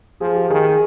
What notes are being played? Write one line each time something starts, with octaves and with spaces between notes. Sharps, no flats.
F3 G#4
G4
D#3 G#4
G#4